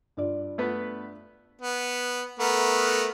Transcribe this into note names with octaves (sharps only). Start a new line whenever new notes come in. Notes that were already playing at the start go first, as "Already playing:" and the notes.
G2 F4 D5
A3 B3 B4
B3
A3 B3 A#4